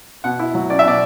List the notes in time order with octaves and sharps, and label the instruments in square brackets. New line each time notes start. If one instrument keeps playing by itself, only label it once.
[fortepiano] B2 F#5
E4
F#3
C#4 D5
E5
B2 D5